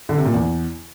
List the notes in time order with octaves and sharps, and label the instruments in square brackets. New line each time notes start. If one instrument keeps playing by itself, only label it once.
[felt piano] D3
C3
A#2
E2